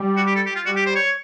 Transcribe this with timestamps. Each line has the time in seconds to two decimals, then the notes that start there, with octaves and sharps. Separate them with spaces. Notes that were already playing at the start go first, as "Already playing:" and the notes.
Already playing: G3
0.17 F#4
0.27 G4
0.36 A4
0.46 G4
0.56 F4
0.66 G3 F#4
0.76 G4
0.86 C5
0.95 C#5